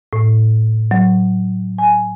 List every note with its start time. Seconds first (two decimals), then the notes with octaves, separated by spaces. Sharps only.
0.13 A2
0.91 F#3
1.78 G#5